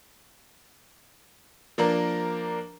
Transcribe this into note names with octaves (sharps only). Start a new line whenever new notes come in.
F3 A#3 D4 A#4